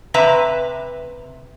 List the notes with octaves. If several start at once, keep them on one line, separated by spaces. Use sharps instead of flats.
C3 B4 E5 A#5